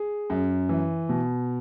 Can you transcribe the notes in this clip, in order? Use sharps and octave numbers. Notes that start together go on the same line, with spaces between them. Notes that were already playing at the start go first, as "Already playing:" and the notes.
Already playing: G#4
F#2
E3
B2